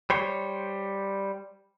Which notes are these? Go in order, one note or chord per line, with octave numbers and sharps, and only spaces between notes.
G3 C5 C#5